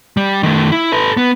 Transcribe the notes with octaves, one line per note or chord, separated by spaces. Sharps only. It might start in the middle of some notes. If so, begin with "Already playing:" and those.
G3
D#3 A3
E4
A4 B4
B3